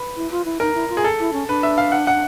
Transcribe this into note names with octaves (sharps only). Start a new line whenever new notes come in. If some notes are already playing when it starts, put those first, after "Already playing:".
Already playing: B4
E4
F4
E4
D#4 A#4
E4
F4
G#4
A4
E4
C#4
D4 B4
E5
F5
F#5
F#5